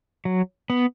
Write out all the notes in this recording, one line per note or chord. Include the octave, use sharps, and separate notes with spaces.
F#3
B3